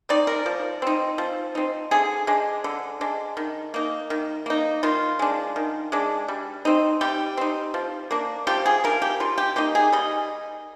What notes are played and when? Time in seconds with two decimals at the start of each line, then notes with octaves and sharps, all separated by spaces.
0.09 C4 D#4 D5
0.27 A#4
0.46 F3
0.82 C4 D#4
1.18 F3
1.55 C4 D#4
1.91 D3 G#4
2.27 G#3 D4
2.64 D3
3.01 G#3 D4
3.37 D#3
3.74 A#3 D#4
4.10 D#3
4.46 A#3 D#4
4.83 D#3 F4
5.19 G#3 D4
5.56 D#3
5.92 G#3 D4
6.28 G3
6.65 C4 D#4
7.01 G3 G4
7.37 C4 D#4
7.74 F3
8.11 A#3 D4
8.47 F3 G4
8.66 G#4
8.84 A#3 D4 A#4
9.02 G4
9.20 G3 F4
9.38 G4
9.56 A#3 D#4 G4
9.75 G#4
9.93 G3 D#5